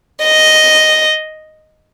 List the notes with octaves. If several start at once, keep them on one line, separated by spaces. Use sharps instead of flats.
D#5